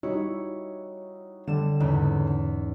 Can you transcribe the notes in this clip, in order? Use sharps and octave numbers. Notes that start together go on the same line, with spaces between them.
G3 D#4 E4 F#4 C#5
D3 G3 E7
E2 G#2 C#3